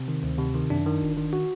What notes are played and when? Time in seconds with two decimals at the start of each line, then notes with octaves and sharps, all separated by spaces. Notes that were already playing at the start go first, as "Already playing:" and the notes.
Already playing: C3 C4
0.08 D#3
0.23 D2
0.39 C3
0.55 D#3
0.70 F#2 D4
0.86 D#3
1.02 G1
1.17 D#3
1.33 F#4